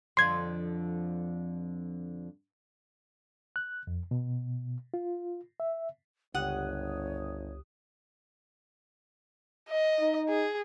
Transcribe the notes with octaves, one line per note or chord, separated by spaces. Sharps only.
F2 D3 F3 C6 G#6
F#6
F2
B2
F4
E5
G1 C#2 G4 C#5 F#5 D#6
D#5
D#4
G#4